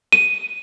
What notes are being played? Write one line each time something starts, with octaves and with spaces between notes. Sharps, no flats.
D#7